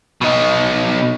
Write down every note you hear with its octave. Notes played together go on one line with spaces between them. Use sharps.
B2 D#4